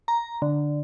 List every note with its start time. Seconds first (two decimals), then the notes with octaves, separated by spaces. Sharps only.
0.08 A#5
0.42 D3